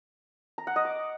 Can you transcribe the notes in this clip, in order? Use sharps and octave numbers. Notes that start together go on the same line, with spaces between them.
A#5
F#5
D#5
D6